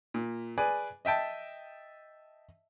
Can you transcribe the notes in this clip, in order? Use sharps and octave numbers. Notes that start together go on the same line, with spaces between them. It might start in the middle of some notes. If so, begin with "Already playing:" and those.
A#2
G#4 B4 D5 G#5
D#5 E5 G5 A5